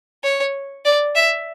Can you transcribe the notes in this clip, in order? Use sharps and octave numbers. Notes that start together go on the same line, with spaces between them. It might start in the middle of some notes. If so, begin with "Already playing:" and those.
C#5
D5
E5